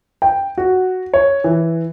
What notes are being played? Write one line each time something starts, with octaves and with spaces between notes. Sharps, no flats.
G5
F#4
C#5
E3